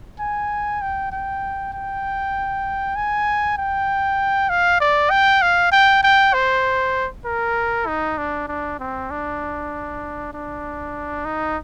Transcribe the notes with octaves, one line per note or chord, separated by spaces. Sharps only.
G#5
G5
G5
G5
G#5
G5
F5
D5
G5
F5
G5
G5
C5
A#4
D#4
D4
D4
C4
D4
D4
D#4